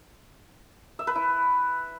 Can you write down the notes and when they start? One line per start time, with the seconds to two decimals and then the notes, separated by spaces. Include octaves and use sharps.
0.99 E5
1.07 B4
1.15 E4